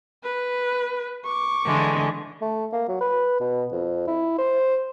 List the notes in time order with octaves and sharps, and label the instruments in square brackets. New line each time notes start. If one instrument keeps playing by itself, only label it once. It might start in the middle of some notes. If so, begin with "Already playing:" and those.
[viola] B4
C#6 D6
[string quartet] D3 E3 G#3
[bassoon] A3
A#3
F#3
B4
B2
F2
E4
C5